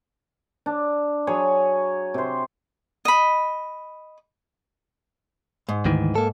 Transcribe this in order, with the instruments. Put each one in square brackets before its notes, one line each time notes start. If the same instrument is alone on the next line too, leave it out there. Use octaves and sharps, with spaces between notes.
[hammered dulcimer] D4
F#3 G#4 C#5
C3 C5
[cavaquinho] D#5 B5
[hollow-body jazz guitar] G#2
[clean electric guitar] D2 D#3 E3
A#3 A4